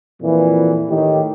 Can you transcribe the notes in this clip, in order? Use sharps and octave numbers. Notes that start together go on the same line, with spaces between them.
F2 A#2 E3
A2 D#3 G4